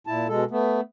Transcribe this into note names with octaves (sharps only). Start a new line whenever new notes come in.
A#2 E4 A5
B2 G#3 A4
A3 B3